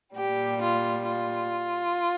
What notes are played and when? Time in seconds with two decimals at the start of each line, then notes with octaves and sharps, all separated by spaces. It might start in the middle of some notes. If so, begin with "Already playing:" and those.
0.15 A#2 G3 G4
0.62 F4
1.07 F4